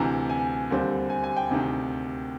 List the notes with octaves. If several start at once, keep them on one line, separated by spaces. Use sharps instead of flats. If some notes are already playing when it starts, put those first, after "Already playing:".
Already playing: D2 C3 E3 A#5
G#5
D#2 D3 G3 C4
G#5
G#5
G5
D2 C3 D#3